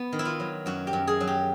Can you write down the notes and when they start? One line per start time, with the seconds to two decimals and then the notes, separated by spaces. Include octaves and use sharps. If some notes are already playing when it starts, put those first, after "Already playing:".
Already playing: B3
0.13 D#3
0.19 E4
0.25 F4
0.40 F#3
0.66 F#2 F#4
0.87 G4
0.93 F#2
1.07 G#4
1.20 F#3
1.27 G4